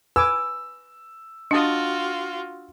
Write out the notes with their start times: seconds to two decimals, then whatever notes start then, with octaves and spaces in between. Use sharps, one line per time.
0.16 B4 G#5 D6 E6
1.51 D4 F4 F#4 D#5 A5 D#6